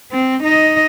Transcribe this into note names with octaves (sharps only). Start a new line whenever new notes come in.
C4
D#4 D#5